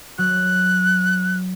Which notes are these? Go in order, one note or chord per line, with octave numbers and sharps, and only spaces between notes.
F#3 F#6